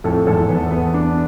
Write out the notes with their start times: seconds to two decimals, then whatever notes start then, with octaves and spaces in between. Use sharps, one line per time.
0.04 F2 A2 A4
0.27 E2 G#2 A4
0.49 E2 B3
0.71 B3
0.94 D4